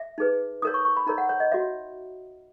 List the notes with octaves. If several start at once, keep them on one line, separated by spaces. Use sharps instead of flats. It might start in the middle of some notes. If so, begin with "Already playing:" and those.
Already playing: E5
D#4 G#4 B4
D#4 A#4 C#5 D#6
C#6
C#6
B5
D#4 A#4 C#5 A#5
F#5
C#5
D#5
F#4 C#5 E5